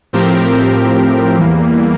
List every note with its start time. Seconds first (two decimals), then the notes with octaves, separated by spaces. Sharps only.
0.13 A2 F3 C4 G4 A#4
1.38 E2 E3 G3 A#3